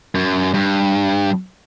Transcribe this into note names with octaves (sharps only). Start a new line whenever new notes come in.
F#2
G2